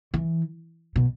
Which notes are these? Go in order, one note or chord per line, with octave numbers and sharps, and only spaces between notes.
E3
B2